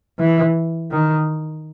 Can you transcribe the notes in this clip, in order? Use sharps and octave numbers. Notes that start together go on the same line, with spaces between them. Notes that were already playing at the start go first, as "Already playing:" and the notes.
E3
D#3